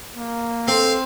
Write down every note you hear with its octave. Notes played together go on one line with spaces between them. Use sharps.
A#3
C4 A4 F5